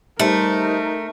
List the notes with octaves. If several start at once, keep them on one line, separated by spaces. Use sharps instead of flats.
G3 A3 D#4 A#4 C5